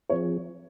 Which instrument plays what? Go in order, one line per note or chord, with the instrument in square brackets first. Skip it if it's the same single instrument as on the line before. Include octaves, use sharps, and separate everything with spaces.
[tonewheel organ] F3 C4 F4 G#4 [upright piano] C#5